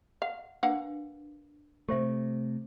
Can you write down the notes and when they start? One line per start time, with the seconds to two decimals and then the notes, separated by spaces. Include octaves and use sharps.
0.22 F5 F#5
0.63 A#3 D4 B4 F5 F#5
1.89 C3 A3 G4 C5 E5